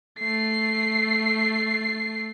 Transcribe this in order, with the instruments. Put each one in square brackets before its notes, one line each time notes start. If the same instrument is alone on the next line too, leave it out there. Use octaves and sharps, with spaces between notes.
[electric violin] A3 C7